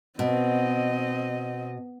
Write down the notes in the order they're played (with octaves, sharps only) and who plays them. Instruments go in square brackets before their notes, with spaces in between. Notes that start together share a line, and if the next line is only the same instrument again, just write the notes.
[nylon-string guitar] B2 [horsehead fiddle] C4 D#5